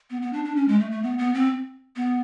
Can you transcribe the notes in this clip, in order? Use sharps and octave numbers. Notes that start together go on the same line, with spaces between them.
B3
B3
D4
D4
C#4
G#3
A3
A3
B3
B3
C4
B3